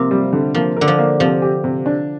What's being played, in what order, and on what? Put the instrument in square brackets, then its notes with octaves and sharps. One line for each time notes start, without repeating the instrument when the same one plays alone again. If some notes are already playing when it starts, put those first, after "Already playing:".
Already playing: [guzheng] C3 F3 [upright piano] A#3
[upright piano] G3
D3
[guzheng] F3 [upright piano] A#3
[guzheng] D3 [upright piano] A#4
[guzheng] F3
[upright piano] A#3
[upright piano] C3 [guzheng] F3
[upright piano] G4
C3
D4